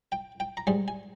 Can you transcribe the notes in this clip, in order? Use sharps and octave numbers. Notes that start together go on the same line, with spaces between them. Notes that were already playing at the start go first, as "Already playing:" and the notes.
G5
G5
A#5
G#2 G3 G#5
G#5